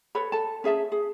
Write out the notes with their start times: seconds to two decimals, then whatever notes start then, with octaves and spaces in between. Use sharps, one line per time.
0.15 A4 B4 C#5 B5
0.32 A4 A5
0.64 C#4 G#4 E5 A5
0.92 G#4